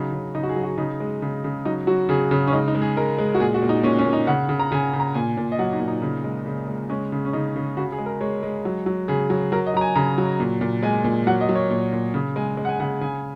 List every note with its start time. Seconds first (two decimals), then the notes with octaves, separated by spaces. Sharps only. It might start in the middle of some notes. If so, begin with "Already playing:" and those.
Already playing: C#3 F#3 D#4
0.12 C#3
0.35 C#3 D#4
0.43 F#4
0.49 G#4
0.56 F#3
0.63 F#4
0.78 C#3 D#4
1.00 G#3
1.22 C#3
1.44 C#3
1.65 F#3 D#4
1.87 F#3 F#4
2.09 C#3 G#4
2.31 C#3
2.47 C#4
2.53 G#3 D#4
2.68 D#4
2.75 G#3
2.82 G#4
2.97 G#3 A#4
3.18 G#3
3.35 F#4
3.40 A#2 G#4
3.54 F#4
3.62 A#2
3.69 D#4
3.83 A#2 C#4
3.98 C#4
4.06 A#2
4.13 D#4
4.27 C#3 F#5
4.49 C#3
4.60 A#5
4.72 C#3 G#5
4.93 C#3
5.00 A#5
5.14 A#2 G#5
5.37 A#2
5.52 D#5
5.59 F#3 F#5
5.73 D#4
5.80 A#2
5.88 D#4
6.02 C#3
6.24 G#3
6.46 C#3
6.68 G#3
6.90 G#3 C#4
7.12 C#3
7.25 C#4
7.33 C#3 D#4
7.56 C#3
7.77 C#3 F#4
7.92 G#4
7.98 G#3
8.06 A#4
8.21 G#3 C#5
8.43 G#3
8.65 F#3
8.86 F#3
9.08 C#3 G#4
9.30 F#3
9.52 F#3 A#4
9.66 D#5
9.74 F#3 A#5
9.81 G#5
9.95 C#3 A#5
10.18 F#3
10.40 A#2
10.61 A#2
10.83 G#3 G#5
11.04 A#2
11.27 F#3 F#5
11.41 D#5
11.49 F#3
11.55 C#5
11.70 A#2
11.93 A#2
12.14 C#3
12.36 G#3 G#5
12.57 G#3
12.65 F#5
12.69 G#5
12.80 C#3 F#5
13.01 C#3 G#5